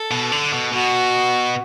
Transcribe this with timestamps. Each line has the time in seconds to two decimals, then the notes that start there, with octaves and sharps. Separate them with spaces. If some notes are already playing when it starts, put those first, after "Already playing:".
Already playing: A4
0.11 B2
0.32 D3
0.53 B2
0.73 B2 F#4